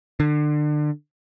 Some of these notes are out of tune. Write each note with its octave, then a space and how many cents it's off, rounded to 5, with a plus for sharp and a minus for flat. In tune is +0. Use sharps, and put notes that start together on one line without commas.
D3 +30